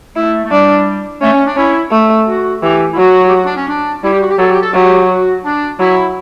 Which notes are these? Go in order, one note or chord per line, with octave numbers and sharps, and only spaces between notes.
A3 E4
A3
G3 D4
A3 C#4
C#4
D4
C#4 E4
A3
F#4
E3 G4
E4
F#3 F#4
G4
F#4
D4
C#4
D4
G3 E4
G4
F#4
G4
F#3 A4
G4
A4
F#3 G4
F#4
D4
F#3 E4